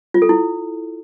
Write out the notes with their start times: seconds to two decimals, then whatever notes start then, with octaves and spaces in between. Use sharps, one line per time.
0.14 F4
0.22 A4
0.29 E4